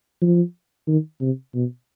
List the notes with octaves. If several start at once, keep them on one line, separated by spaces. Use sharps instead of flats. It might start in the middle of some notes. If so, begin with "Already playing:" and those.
F3
D#3
C3
B2